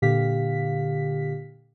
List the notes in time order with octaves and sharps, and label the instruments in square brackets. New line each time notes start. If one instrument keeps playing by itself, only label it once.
[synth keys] A#2 D3 G4 F5 B6